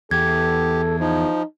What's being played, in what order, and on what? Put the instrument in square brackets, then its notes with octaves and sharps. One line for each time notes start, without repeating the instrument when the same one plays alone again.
[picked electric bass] E2 [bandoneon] G4 [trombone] A4 [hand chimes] G#6
[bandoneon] F3 [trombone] D#4